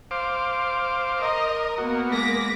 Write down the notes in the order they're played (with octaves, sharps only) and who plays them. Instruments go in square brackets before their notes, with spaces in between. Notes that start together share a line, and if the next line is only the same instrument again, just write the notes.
[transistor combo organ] C5 F5 D6
[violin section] A#4 [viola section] D#5
[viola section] A#3 B3 [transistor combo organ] F#4
[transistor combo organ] G#3 [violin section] D6 A#6 B6